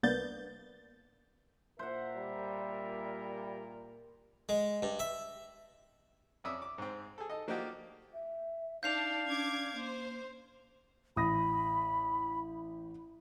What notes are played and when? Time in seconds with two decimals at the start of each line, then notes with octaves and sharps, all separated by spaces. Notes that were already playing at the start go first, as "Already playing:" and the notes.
0.03 C2 A#3 B3 D4 G6 A6
1.79 A#2 A#4 C5 E5 F#5
2.16 G3
4.49 G#3
4.82 G2
4.99 E5
6.44 F2 C#4 D5 E5 D#6 E6
6.62 D6
6.78 G#2 C4
7.18 G#4 A4
7.30 D#4 A4 D#5
7.48 F3 A#3 D4 D#4 F#4 G4
8.13 E5
8.83 D4 D#4 F5 G6 C7 F7
9.27 C#4 D4 D6 G#6
9.75 A#3 C5
11.16 A1 B5 D#6 A#6